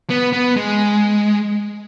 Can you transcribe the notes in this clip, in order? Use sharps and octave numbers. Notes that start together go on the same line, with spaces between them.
B3
B3
G#3